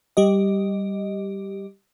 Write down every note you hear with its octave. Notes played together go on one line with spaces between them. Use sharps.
G3 G4 D#5